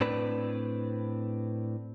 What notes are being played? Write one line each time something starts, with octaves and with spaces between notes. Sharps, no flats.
A2 C4 D4 B4